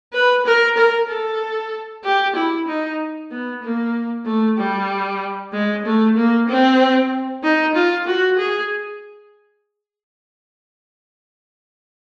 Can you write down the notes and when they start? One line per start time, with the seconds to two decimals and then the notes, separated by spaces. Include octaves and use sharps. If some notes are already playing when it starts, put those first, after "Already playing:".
0.13 B4
0.46 A#4
0.77 A#4
1.09 A4
2.05 G4
2.36 E4
2.68 D#4
3.31 B3
3.64 A#3
4.26 A3
4.58 G3
5.53 G#3
5.86 A3
6.17 A#3
6.49 C4
7.44 D#4
7.75 F4
8.07 F#4
8.39 G#4